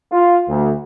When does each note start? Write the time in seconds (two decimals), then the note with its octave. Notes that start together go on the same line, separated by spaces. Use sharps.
0.11 F4
0.48 D2